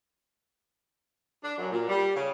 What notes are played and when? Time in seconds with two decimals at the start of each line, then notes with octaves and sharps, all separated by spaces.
1.43 D4
1.58 F#2
1.71 A#2
1.89 G3
2.16 C#3